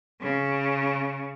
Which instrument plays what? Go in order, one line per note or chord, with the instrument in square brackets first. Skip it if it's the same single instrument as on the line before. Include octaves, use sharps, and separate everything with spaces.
[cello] C#3